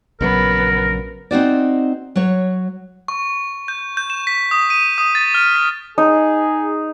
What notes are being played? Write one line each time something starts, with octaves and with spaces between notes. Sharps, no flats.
A#1 C#3 F#3 B3 A#4
C4 D#4 F#4 D5
F#3 C#5
C#6
G6
G6
E7
B6
D#6
D#7
D#6
A6
F6
B6
D#4 G#4